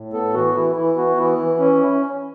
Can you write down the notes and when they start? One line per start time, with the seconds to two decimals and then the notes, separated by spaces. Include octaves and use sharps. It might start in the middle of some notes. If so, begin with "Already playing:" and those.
Already playing: A2
0.13 B3 A4
0.34 E3 F#4
0.55 E3 E4
0.76 E3 E4
0.97 B3 F#4
1.17 E3 E4
1.38 E3
1.59 C#4